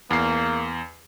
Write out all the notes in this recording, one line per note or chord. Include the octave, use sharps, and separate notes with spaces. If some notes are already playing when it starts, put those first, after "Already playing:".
E2 A#3 C7